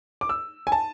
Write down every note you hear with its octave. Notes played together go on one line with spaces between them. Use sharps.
D6
E6
G#5
A5